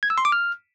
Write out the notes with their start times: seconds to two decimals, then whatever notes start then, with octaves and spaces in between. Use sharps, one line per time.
0.03 G#6
0.10 E6
0.18 C6
0.25 D6
0.32 F6